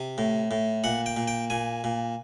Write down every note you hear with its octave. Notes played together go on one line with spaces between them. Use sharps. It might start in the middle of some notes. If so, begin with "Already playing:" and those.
Already playing: C3
A2
A2
A#2 F#5
G5
A#2
G5
A#2 G#5
A#2